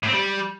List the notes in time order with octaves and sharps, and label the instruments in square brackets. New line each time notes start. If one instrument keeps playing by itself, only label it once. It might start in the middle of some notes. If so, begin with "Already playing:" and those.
[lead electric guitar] A2
C4
G3